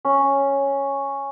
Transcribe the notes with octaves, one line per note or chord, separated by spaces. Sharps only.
C#4